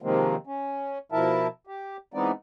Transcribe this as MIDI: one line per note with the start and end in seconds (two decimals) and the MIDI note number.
0.02 0.36 48
0.02 0.36 51
0.02 0.36 53
0.02 0.36 56
0.02 0.36 58
0.02 0.36 60
0.47 0.98 61
1.12 1.47 47
1.12 1.47 53
1.12 1.47 64
1.12 1.47 70
1.12 1.47 76
1.12 1.47 81
1.67 1.97 67
2.14 2.31 52
2.14 2.31 56
2.14 2.31 59
2.14 2.31 60
2.14 2.31 63
2.14 2.31 74